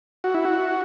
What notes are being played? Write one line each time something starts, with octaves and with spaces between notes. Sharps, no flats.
F#4
E4
F#4